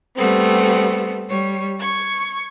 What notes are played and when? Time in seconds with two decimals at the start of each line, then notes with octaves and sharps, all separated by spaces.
0.16 G3 A3 B3 C4
1.28 G3 C#5
1.81 C#6 G#6